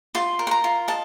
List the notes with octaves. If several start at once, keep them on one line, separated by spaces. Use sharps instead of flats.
F4 C6
A#4
C6
A#5
F4
D#5 A5